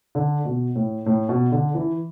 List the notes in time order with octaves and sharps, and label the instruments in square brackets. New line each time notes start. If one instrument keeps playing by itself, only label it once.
[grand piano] D3
B2
A2
A2
B2
D3
E3